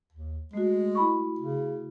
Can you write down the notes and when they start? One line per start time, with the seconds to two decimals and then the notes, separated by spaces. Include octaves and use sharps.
0.13 D#2
0.54 G#3 A3 F#4
0.95 E4 B5 C#6
1.39 C#3